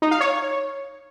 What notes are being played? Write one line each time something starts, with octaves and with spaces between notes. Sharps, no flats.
D#4
F5
C#5